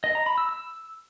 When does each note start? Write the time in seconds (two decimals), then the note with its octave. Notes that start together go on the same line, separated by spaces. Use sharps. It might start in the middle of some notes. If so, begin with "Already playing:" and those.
0.04 D#5
0.15 A#5
0.26 B5
0.38 E6
0.49 E6